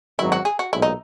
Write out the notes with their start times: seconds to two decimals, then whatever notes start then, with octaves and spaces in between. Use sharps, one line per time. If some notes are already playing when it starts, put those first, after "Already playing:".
0.18 G#1 F#2 D#3 F#3 E4
0.32 F#4
0.45 G#4
0.59 F#4
0.72 B1 A#2 G#3 E4
0.82 D#4